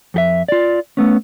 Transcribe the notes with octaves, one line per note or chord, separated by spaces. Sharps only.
F2 G4 E5
F4 D5
A3 B3 C#4